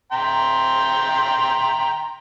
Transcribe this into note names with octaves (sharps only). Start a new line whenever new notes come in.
G5 A#5 C6